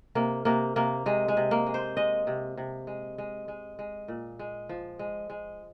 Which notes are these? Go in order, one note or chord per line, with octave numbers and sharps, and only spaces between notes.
C3 A#3
C3 A#3
C3 A#3
C3 G#3
G#3
C3
A#3
G#3
C5
G#3 D#5
C3
C3
G#3
G#3
G#3
G#3
A#2
G#3
F3
G#3
G#3